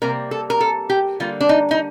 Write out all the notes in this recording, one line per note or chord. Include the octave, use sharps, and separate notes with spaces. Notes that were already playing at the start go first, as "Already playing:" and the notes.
C3 G3 A#3 A#4
A4
A#4
A4
G4
D3 G3 A#3 F4
D4
D#4
D#4